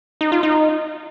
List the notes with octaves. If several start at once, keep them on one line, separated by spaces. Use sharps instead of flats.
D#4
F4
D#4